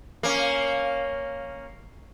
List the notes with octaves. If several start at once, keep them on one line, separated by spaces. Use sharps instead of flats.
A#3 C#4